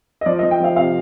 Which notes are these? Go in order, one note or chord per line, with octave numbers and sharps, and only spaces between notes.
D#5
F3 D5
D#5
F3
G5
F3 F5
C3 F5